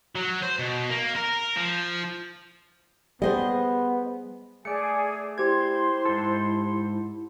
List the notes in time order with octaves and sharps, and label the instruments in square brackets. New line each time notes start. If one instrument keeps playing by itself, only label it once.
[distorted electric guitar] F#3
C5
B2
A#3
A#4
F3
[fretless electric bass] G3 [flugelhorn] B3 [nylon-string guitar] G#4 C5 D#5
[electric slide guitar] A3 D5 [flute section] G#4 G#5 [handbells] C#7
[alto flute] E4 [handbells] G4 G#6 [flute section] C5 C6
[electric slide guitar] G#2 A4